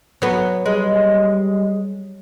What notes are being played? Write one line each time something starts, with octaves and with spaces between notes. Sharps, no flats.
F#3 B3
G3 G#3